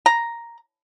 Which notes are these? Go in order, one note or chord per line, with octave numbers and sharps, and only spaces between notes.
A#5